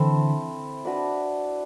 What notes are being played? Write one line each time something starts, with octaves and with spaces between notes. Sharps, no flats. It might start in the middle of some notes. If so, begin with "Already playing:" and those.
Already playing: D3 E3 C4 E4 A4
D4 F#4 B4 D5